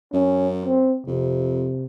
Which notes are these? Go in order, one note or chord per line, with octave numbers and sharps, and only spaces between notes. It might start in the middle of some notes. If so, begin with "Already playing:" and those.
F#2 C#4
C4
F2 C3